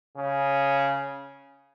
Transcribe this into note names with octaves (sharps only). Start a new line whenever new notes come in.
C#3